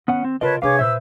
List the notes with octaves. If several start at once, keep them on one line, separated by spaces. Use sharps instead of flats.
D#3 B3 C#4 F#5
C4
C#3 F4 A#4 B4 C#5 D#5 A5
C3 D4 G#4 B4 C#5 F5 D6
A#2 B4 C5 E5 E6